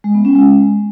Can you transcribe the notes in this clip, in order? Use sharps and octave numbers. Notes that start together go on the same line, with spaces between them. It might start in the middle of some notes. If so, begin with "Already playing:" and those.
G#3
B3
C#4
G#3